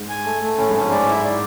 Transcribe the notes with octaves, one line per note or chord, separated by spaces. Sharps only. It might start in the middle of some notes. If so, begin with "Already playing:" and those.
Already playing: G#2
G#5
A3
A3
A2 C#4
G#2
C#4
F#2
G#2 D5
E4
D5